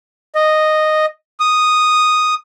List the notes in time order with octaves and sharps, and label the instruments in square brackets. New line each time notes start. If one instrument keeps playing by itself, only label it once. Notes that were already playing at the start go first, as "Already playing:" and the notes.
[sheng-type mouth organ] D#5
D#6